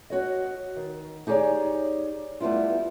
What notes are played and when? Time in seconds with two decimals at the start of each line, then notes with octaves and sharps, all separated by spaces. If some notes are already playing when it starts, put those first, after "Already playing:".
0.10 F#4 C#5 D#5
0.76 D#3
1.27 D#4 G4 G#4 C#5 D5
2.40 G3 A3 B3 E4 F4